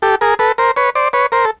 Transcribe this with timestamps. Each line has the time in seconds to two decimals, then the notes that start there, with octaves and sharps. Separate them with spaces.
0.02 G4 A4
0.21 G#4 A#4
0.39 A4 B4
0.58 A#4 C5
0.76 B4 C#5
0.95 C5 D5
1.13 B4 C#5
1.32 A#4 C5
1.45 A4